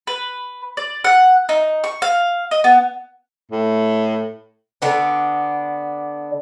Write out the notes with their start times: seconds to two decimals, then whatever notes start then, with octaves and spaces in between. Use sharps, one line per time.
0.07 B4
0.77 D5
1.04 F#5
1.49 D#4
1.84 C#6
2.02 F5
2.51 D#5
2.64 B3
3.52 A2
4.82 D3 B3 D4